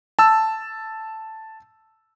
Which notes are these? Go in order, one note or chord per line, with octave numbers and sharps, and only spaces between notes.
A5 E6